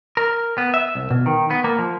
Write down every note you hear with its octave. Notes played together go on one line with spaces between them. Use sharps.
A#4
B3
E5
C2
B2
D#3
B3
A#3
F3